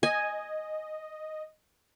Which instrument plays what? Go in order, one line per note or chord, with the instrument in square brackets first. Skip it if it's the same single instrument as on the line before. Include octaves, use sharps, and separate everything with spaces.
[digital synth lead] D#5 [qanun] G#5